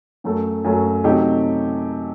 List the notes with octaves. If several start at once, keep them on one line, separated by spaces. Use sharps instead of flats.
F#2 F#3 A3
F#2 F#3 A3
C3 F#3 A3 D#4 G4